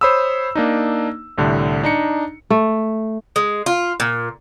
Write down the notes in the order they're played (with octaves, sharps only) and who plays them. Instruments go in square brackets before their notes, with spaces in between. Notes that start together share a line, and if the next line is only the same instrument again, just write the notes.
[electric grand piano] C5 C#5 B5 D#6 E6
A#3 D4 D#4
C2 A2 D3 G3
D4 D#4 A#5 C#7
[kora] A3
[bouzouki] G#3
F4
A#2